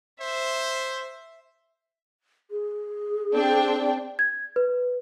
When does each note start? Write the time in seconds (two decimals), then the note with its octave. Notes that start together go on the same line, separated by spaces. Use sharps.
0.21 C5 E5
2.51 G#4
3.33 C4 D4 G5
4.19 G#6
4.56 B4